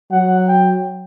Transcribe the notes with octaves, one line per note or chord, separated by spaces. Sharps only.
F#3 F#5
G5